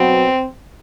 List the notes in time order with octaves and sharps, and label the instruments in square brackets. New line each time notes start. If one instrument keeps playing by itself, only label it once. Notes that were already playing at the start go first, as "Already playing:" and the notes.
Already playing: [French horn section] B2 F#3 B3 C4